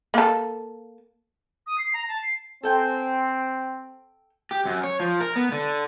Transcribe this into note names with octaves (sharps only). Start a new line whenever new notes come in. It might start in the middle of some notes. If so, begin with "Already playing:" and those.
A#3 A4
D#6
C7
A#5
A5
C7
C4 A4 G5 G#5
G4
F#2
C#5
F3
A#4
B3
D3